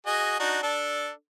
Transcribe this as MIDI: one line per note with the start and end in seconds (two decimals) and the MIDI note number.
0.07 0.37 66
0.07 0.37 68
0.07 0.37 75
0.40 0.59 62
0.40 0.59 63
0.40 0.59 66
0.63 1.10 62
0.63 1.10 69